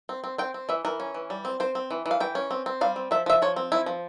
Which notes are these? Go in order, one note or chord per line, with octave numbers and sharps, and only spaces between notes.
C4
C4
C4 G5
C4
E3 E5
E3 A#4
C#4
E3
G3
C4
C4 C5
C4
E3
E3
F5
E3 G5
C#4
C4
C4
G3 F5
C4
F3 E5
F3 E5
F3 C#5
C4
F3 E4
F3